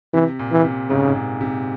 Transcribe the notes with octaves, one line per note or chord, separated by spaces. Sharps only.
C3 E3
A#2
E3
C3
G#2 C#3
G#2
A#2
C3